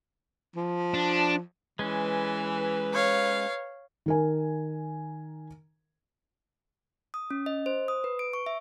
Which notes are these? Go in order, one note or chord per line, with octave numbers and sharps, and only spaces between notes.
F3
D4
E3 G#3 C#4 B4
C#5 F5
D#3 A#4 G#5
D#6
C#4
D#5
C5
D#6
B4
D7
C#6
E5